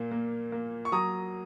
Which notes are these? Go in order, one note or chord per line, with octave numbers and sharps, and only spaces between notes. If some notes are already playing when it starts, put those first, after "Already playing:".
Already playing: A#2 A#3
A#3
A#3
C#6
F#3 A#5 D#6